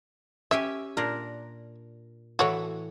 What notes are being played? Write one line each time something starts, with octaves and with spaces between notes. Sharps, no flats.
C#4 G4 E5 G#5
A#2 D4 A#4
A2 E3 F#4 C#5